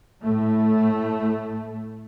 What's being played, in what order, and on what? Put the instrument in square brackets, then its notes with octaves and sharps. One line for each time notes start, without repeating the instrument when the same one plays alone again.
[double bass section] A2 A3